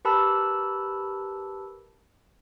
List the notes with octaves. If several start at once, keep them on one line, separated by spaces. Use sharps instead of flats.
G4 A#4 B4 A5 B5 E6